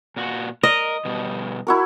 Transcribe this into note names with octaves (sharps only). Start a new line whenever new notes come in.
A#2 F#4
A#4 D#5
B2 G3
E4 F#4 A#4